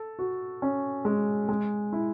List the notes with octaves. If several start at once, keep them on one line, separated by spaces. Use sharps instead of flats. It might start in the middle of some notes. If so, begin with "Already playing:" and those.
Already playing: A4
F#4
C#4
G#3
G#3
E4